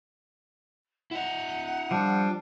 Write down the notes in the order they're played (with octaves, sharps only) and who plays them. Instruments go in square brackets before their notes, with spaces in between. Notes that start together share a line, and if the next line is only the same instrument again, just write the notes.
[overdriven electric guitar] E4 D#5 [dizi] F#5
[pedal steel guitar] F3 G3 [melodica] D4